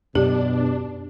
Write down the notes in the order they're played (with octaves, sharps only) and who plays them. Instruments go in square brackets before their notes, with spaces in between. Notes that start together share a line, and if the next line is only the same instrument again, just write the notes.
[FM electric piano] F#2 [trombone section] B2 [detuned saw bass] D4 [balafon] G4